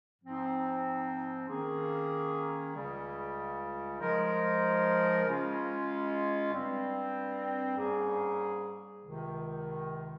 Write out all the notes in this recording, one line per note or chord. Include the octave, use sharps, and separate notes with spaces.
G#2 F3 C4 D#4
D#3 A#3 C#4 G#4
C#2 C#3 G3
F3 G#3 D#4 A#4
C#3 G#3 C#4 F4
G2 G3 C4
G#2 G3 A#3 C#4 G#4
C#2 C3 D#3